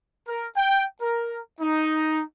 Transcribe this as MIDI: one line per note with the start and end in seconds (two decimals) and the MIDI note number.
0.27 0.47 70
0.56 0.84 79
1.02 1.38 70
1.61 2.22 63